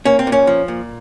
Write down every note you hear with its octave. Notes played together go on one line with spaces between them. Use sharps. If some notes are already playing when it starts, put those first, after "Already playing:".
A#3 C#4
C4
A#2
C#4
F3
A#2